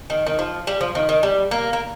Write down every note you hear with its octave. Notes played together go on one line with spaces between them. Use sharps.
D#3
D#3
F3
G3
F3
D#3
D#3
G3
A#3
A#3